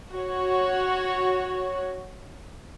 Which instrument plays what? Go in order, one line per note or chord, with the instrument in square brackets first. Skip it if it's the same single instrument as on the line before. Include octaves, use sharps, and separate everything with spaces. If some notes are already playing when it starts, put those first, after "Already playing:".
[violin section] F#4 C#5